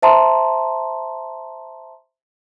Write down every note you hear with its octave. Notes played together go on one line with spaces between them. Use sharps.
C5 E5 A5 A#5 C6